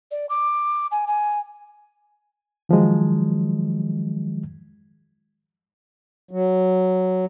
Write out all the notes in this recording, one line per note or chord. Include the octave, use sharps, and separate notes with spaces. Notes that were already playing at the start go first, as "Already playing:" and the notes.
D5
D6
G#5
G#5
D#3 F3 F#3 G#3
F#3